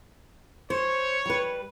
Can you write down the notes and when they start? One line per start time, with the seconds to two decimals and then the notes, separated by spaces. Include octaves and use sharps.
0.70 C5 C#5
1.26 G3 B4